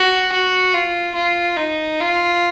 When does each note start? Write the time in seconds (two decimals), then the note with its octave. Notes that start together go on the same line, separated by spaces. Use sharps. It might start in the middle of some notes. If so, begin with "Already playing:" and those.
Already playing: F#4
0.32 F#4
0.74 F4
1.15 F4
1.57 D#4
2.00 F4